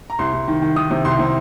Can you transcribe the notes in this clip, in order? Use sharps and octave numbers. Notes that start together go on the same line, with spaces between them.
A#5
C2 C6
C2
D#3
D#3
D#3 D#6
C3
C2 C6
C3